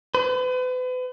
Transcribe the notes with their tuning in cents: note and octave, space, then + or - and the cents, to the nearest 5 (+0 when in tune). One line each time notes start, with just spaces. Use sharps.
B4 +40